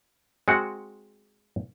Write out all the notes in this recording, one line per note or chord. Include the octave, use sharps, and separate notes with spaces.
G#3 C4 F#4 F#5